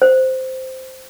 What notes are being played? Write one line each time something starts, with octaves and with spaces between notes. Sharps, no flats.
C5